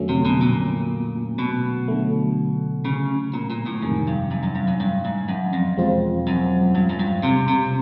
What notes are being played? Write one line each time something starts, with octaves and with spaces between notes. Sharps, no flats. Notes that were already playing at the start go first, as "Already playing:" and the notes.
Already playing: F2 D3 F#3 A3 C#4
C3
B2
A#2
B2
D3 F#3 A3
C#3
A#2
A#2
A2
F2 G#2 C3 D#3
G2
F#2
F#2
G2
F#2
G2
G#2
F#2
F2
E2 B2 G#3 C4 F4
F#2
G2
F#2
G2
C3
C3